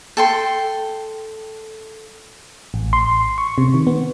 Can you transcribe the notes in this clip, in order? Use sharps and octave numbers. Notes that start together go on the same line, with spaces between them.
A4 G5 C6
A1
C6
C#6
C3
D#3
B3